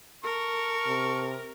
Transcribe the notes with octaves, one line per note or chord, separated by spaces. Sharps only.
A4 A#4 C#6
C3